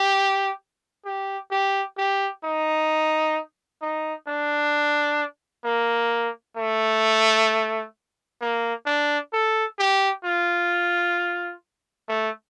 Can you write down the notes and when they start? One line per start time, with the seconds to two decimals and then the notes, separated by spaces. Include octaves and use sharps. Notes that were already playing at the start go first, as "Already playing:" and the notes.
Already playing: G4
1.05 G4
1.51 G4
1.98 G4
2.44 D#4
3.82 D#4
4.28 D4
5.65 A#3
6.57 A3
8.41 A#3
8.86 D4
9.33 A4
9.79 G4
10.25 F4
12.08 A3